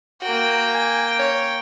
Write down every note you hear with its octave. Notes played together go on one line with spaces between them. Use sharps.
A#3 F#4 G5
G#5
C#5